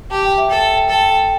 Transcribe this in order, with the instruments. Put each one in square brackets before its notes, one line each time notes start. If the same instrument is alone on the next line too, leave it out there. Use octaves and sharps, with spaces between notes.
[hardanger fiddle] G4 [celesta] A5
[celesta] G5
E5
[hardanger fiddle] A4 [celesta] G5
[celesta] A5
G5
A5
[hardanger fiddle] A4 [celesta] G5
[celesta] A5
G5